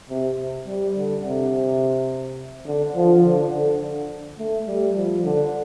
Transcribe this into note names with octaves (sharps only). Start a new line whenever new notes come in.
C3
G3
D3
C3
D3
F3
D3
D3
A3
G3
F3
D3